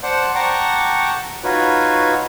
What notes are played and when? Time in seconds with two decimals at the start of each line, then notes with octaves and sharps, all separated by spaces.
0.03 C5 D5 F#5 A5
0.35 F#5 G5 A5 A#5 C#6 D6
1.44 D#4 F4 F#4 B4 C#5